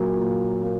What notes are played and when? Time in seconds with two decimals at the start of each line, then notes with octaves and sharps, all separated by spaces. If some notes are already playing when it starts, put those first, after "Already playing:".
Already playing: A#2 F#3 A#3
0.17 A#2
0.63 A#3